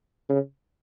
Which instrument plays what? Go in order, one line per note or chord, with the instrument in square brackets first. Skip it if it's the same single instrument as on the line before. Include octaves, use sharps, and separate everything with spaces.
[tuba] C#3